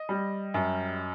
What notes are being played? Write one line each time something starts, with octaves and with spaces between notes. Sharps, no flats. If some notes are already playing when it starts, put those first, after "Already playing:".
Already playing: D#5
G3
F#2